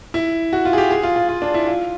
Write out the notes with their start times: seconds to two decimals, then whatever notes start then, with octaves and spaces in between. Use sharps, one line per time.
0.14 E4
0.53 F#4
0.65 F4
0.73 G#4
0.78 G4
0.91 G#4
1.03 F4
1.16 F4
1.29 F4
1.42 D4
1.54 E4
1.67 F4